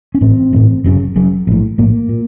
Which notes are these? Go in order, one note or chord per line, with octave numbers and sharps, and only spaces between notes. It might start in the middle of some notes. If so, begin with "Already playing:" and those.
C#4
A1 A2 C4
A1 A2
F#1 F#2 C#3
F#1 F#2 C#3
A#1 A2
A#1 A2 A#3
A#2